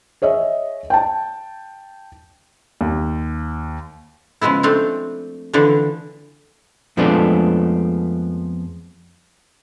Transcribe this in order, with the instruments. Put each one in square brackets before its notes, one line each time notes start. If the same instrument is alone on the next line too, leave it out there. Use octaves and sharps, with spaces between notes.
[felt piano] G#4 C#5 D#5 E5
G5 A5
D#2
[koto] C#3 F3 G#3 B3 E4
A3 C4 D4
D3 E3 F3 D4
[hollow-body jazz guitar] F2 F3 G#3 A3 B3 D4